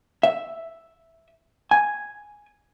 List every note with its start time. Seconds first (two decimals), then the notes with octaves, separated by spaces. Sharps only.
0.23 E5
1.71 G#5